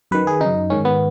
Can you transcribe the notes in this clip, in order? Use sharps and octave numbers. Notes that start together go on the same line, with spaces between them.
F#2 D#3 B4
G#4
F#2 C#3 D#4
G#2 D#3 C#4
B3